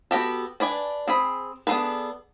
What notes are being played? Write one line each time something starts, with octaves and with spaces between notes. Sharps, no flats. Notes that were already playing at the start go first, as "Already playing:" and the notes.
B3 F#4 G4 A4
D4 B4 D5 G#5
C4 G#4 B5
B3 D4 G#4 A4 B4